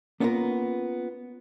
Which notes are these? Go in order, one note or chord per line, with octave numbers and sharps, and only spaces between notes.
A#3 B3 C#4 D4 F4 A#4